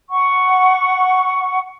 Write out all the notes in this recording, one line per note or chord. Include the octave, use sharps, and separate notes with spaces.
F#5 C#6